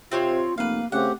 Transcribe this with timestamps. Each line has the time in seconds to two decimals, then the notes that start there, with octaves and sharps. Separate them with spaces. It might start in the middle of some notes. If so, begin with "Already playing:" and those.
0.11 C3 C4 F4 C5 C#5
0.58 F1 A#3 B4 F5
0.92 C#3 A3 C4 G4 F#5